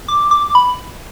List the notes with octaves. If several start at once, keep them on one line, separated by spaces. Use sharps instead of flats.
D6
D6
B5